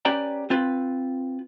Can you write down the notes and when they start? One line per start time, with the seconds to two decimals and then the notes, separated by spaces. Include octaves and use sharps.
0.05 C#4 G4 B4 D5 G5 A#5
0.50 C4 F4 B4